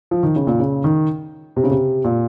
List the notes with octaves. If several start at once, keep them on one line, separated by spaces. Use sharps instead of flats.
F3
D#3
C#3
A#2
C#3
D#3
C3
C#3
C3
A#2